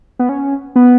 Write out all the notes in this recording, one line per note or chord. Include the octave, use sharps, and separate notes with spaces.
B3
C#4
B3